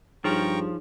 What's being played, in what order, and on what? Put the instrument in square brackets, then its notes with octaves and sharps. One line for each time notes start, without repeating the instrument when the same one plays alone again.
[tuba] G2 [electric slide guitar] F3 [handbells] D#4 G#4 C#5 [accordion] G5 A#5 C#6